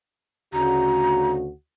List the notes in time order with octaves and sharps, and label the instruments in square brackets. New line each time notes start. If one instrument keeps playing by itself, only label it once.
[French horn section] D2 C#3 F#4 [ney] A#5